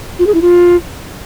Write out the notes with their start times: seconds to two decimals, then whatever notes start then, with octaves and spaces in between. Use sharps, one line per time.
0.19 F4
0.27 G#4
0.34 E4
0.42 F4